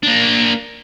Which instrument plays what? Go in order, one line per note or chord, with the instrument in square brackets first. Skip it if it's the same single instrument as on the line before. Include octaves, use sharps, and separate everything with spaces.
[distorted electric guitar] A#3 D4